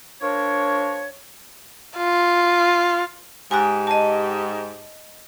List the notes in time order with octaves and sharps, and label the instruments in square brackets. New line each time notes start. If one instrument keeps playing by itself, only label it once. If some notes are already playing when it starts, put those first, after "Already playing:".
[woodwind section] F3 D4 A#4 C#5
[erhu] F4
[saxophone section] G#2 G4 [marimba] G#5 D#6 F#6
[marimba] D#5 A5